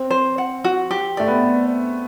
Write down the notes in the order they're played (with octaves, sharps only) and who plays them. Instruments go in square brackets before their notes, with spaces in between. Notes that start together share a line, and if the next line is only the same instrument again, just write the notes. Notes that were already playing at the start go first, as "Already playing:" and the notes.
Already playing: [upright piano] C4
[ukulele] C5
F#5
F#4
G4
[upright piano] A3 [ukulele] D5
[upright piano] B3